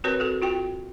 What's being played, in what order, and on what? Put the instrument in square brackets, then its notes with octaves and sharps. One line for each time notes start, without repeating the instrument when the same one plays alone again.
[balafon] C4 F#4 A#4 B4 C#5
F#4 A4
F4 F#4 G5